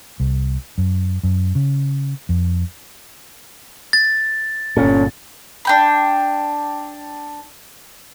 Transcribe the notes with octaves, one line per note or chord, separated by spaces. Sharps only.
C2
F#2
F#2
C#3
F2
A6
G1 A#2 C#4 A4
D4 G5 B5